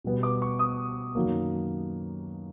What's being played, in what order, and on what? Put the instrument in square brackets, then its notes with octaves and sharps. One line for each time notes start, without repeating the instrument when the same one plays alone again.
[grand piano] B2 G3 B3
D6
C#6
D#6
F#2 D#3 F#3 A#3